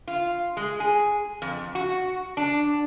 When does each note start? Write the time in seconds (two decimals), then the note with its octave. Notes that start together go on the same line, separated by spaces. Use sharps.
0.08 F4
0.57 G#3
0.80 G#4
1.42 F2
1.75 F#4
2.37 D4